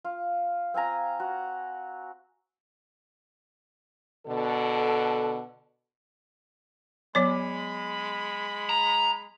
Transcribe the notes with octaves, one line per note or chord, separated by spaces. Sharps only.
F4
C4 F4 G#5 A#5
F#4
B2 D3 A4
F#3 G#3 B3 C#5 B5
A#5